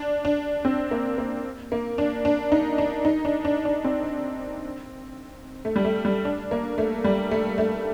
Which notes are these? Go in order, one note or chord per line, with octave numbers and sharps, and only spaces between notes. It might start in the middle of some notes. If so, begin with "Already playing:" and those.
Already playing: D4
D4
C4
A#3
A#3
A#3
D4
D4
D#4
D4
D#4
D4
D4
D4
C4
A3
G3
A3
G3
D4
A#3
A3
G3
A3
A3